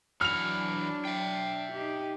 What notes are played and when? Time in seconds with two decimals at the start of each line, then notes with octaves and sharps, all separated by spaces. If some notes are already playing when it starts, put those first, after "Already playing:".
0.21 E3 F#3 D4 F#4 F6 F7
1.05 E5 G5
1.74 D#4 G4